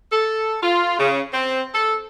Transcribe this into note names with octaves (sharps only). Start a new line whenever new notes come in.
A4
F4
C#3
C4
A4